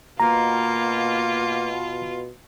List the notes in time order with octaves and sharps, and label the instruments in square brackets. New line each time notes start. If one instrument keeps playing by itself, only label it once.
[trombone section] B2 [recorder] A#3 [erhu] F4 [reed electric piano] A#5